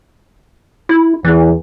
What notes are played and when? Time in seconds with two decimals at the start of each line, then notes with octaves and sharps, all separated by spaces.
0.89 E4
1.25 E2 E3